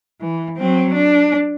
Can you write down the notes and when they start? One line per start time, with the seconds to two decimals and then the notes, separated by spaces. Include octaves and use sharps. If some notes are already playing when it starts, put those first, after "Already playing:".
0.20 E3
0.57 F#3 C4
0.94 D4